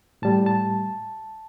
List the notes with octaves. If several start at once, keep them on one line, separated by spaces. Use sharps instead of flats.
A2 G3 A5
A5